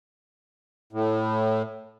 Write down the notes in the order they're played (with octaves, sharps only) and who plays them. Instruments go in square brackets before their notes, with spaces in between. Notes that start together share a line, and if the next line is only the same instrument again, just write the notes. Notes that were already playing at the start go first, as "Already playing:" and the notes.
[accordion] A2